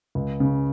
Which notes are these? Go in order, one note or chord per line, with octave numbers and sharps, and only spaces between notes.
C#2
C#3